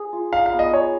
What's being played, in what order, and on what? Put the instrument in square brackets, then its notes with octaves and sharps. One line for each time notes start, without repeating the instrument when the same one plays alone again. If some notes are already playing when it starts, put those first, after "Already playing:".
Already playing: [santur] G#4
F4
[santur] D#4 [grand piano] F5
[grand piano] F5
[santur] B3
[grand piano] D#5
[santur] G#4 [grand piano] C#5